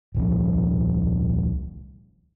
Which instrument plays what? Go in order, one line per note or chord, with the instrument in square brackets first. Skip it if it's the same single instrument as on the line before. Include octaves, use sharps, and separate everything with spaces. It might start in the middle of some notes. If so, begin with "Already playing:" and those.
[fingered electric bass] D#1 C2 F3